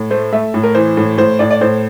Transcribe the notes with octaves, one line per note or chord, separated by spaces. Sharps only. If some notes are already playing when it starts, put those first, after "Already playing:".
Already playing: A2
A3 C5
A3 E5
A2
A#4
E3 C5
A2
A2 C5
A2 D5
D5
A2 C5